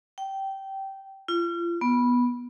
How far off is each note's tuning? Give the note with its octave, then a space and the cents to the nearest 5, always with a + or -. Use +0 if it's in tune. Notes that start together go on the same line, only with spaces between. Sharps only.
G5 -15
F4 -35
B3 -10